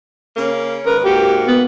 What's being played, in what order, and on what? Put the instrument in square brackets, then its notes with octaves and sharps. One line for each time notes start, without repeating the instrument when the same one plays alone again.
[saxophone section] C#3 A#3 C#4
[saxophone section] G#2 D#3 B4 [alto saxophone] A#4
[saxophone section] G#2 A#3 F#4 [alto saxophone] G4
[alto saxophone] B3